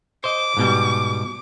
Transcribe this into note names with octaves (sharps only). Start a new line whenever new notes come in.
C5 D#5 D6
G#2 B2 G3